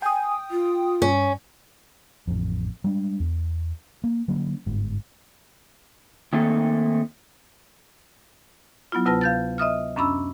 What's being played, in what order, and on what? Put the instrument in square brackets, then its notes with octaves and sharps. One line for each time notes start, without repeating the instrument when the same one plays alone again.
[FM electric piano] G5 D#6 [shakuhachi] G#5
[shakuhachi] F4
[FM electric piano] G2 [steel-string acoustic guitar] C#4
[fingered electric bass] A1 F2
G3 G#3 D4
E2
A#3
D3 F#3 A#3 C#4
G1 G#2
[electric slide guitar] D#3 A3 A#3 C4 D#4 A4
[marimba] F#3 B3 E4 F4
D2 C3 F4 B4 A5 A#6
F5 G6 A6
D#5 E5 D#6 F6
F#2 C#4 D4 B5 E6